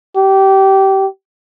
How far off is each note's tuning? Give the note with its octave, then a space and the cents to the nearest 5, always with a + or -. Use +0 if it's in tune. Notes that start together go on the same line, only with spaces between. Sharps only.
G4 -20